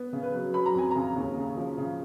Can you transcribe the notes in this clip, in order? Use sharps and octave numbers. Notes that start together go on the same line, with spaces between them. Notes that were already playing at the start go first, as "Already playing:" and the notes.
Already playing: B3
C#3
B4
F#3
F#3 B5
A#5
F2 G#5
C#3 A#5
D#2
C#3
F3
C#3